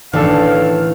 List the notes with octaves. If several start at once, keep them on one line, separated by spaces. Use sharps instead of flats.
A1 D#3 D4 A4 F5